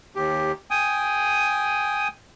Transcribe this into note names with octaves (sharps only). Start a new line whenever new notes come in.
D#2 G4
G5 G#5 D#6